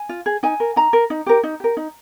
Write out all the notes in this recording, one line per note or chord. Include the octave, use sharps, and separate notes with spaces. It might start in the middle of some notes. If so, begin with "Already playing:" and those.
Already playing: G#5
F4
G#4
D#4 G#5
A#4
D#4 A#5
A#4
D#4
G4 A#4
D#4
G4 A#4
D#4